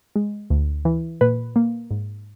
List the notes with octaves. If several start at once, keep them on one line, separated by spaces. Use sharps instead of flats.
G#3
D2
E3
A#2 B4
A#3
G#2